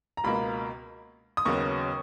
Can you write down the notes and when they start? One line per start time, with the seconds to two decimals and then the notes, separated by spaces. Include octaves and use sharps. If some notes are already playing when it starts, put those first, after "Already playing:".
0.17 A#5
0.24 C#2 B2 A#3 B5
1.37 D#6
1.45 D#2 C#3 F#3 B3 C#6